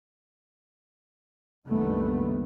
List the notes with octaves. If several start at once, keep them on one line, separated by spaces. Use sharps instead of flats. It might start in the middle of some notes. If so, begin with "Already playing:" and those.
F#1 C2 G2 D#3 A3 B3